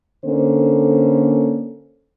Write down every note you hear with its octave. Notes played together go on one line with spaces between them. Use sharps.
D3 A#3 C#4 A4 C5